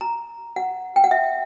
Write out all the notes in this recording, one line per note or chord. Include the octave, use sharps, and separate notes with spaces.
A#5
F#5
G5
F#5
E5